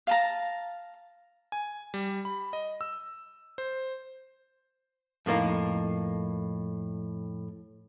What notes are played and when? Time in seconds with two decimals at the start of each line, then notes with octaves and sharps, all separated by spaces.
0.07 F5 A5 A#5
1.52 G#5
1.94 G3
2.25 B5
2.53 D#5
2.81 E6
3.58 C5
5.26 F2 A2 A#3 D#4